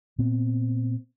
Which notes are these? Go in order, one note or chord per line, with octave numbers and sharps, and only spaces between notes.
A#2 B3 C4